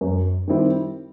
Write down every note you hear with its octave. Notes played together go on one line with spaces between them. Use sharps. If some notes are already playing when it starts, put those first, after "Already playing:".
F#2
D#3 G3 C4 E4